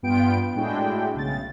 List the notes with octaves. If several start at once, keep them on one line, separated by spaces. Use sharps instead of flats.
G2 B3 F4 G5 D7
A2 G#3 D4 E4 F#4 G5
B1 C#3 A6